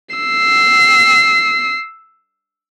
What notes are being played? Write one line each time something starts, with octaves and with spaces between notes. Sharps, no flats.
E6 C7